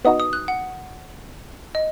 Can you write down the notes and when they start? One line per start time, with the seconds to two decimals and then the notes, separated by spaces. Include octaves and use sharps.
0.05 B3 D#4 F#4 D#6
0.20 D#6
0.33 F#6
0.48 F#5
1.75 D#5